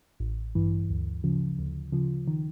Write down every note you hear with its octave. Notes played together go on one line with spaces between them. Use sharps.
A1
G2 E3
D2
C#3 F3
D2
C#3 F3
D#3